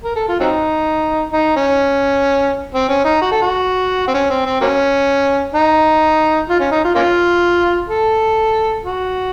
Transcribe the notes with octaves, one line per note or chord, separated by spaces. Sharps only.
A#4
A4
F4
F#3 C4 D#4
D#4
C#4
C4
C#4
D#4
F#4
A4
F#4
C4
C#4
C4
C4
F#3 A#3 C#4
D#4
F4
C#4
D#4
F4
A#3 C#4 F4
A4
F#4